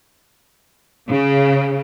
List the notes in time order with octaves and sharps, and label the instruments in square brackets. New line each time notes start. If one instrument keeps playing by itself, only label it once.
[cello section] C#3